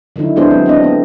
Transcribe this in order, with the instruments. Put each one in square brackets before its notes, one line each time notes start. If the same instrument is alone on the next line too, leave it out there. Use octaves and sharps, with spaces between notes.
[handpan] D3 D#3 F#3 D#4 E4
G#3 B3 D4 E4 G#4 C5
F#3 C4
C4 D4 D#5
A3 B3